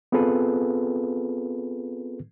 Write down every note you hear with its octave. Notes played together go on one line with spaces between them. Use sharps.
B3 C4 F4 G#4 A4 B4